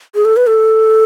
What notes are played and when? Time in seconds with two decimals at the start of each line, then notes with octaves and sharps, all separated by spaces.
0.15 G#4
0.25 A4
0.37 B4
0.47 A4